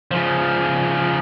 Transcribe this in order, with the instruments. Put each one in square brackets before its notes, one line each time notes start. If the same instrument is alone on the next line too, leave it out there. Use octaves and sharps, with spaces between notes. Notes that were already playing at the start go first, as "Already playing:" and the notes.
[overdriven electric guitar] C#3 F3